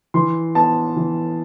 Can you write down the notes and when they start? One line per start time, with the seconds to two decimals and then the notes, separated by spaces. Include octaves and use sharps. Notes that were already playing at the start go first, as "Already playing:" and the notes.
0.14 E3 C6
0.55 B3 A5
0.96 E3